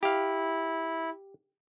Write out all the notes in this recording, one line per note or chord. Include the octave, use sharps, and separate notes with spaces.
E4 G4 F5